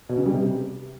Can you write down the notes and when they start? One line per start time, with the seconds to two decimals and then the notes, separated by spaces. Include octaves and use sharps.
0.09 B2
0.18 C#3
0.26 G3
0.34 C3